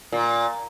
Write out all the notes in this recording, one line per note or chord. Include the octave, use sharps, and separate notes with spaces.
A#2